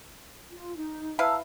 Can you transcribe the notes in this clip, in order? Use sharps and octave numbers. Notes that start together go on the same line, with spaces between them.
F4
D#4
E4 B4 F5 A5 A#5 E6